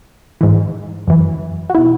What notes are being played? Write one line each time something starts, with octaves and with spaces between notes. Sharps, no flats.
G#2 E3
F#2 E3
F#4
B2 E4